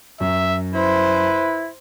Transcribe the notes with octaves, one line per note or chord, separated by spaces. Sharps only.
F#2 E5
E4 B4 C5